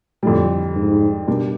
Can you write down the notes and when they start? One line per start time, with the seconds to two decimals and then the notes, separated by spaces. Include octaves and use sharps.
0.23 F2 A2 D3 G3
0.75 G#2
1.27 B2 G3 A#3 D4